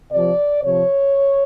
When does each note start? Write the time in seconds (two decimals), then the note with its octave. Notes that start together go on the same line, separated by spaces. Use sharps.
0.12 C3 F3 D5
0.64 C3 F3 C#5